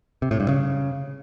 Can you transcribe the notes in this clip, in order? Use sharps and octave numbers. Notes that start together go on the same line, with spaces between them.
C3
A2
G2
C#3